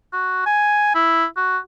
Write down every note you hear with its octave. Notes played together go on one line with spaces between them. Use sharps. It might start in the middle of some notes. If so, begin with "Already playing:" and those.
F#4
G#5
E4
F#4